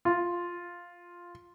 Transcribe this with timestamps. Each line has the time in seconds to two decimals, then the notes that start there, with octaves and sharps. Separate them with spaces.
0.05 F4